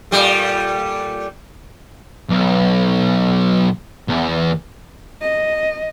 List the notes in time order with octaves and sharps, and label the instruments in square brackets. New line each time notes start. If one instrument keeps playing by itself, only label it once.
[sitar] A#2 G3 A3
[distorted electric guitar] B1
E2
[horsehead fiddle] D#5